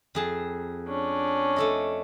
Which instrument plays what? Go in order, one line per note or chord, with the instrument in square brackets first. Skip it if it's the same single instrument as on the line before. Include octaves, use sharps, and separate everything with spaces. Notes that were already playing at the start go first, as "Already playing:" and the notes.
[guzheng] F2 G#4 A5
[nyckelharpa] C#4 D4
[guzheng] A3 A4 D#5